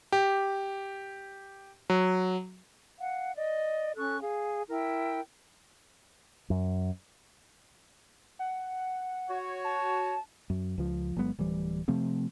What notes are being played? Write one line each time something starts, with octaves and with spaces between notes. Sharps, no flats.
G4
F#3
F5 F#5
D5 D#5
C#4 A4 C#6 F#6
G#4 F5
E4 A#4 G5
F#2
F#5
F#4 C#5
A5
F#2
C#2 F3
G1 F#3 G#3 B3
D1 E3 G3
C3 F3 A3 C4